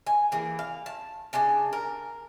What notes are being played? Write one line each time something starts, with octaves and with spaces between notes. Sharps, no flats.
G#5
E3 A#3 G#4
F5
A5
C#3 D4 G#5 A5
A#4